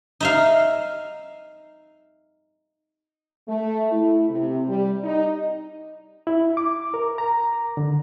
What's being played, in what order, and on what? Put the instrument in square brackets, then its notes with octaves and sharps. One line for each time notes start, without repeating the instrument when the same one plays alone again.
[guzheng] D#4 E5 F5
[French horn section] A3
E4
C3
G3
D#4
[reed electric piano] E4
D6
A#4
A#5
D3